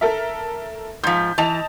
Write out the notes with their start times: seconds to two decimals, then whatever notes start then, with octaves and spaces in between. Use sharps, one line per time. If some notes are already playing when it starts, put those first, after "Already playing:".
0.01 A4 A#4 E5
1.04 G#2 F3 G6 B6
1.38 E3 D#5 A5 F7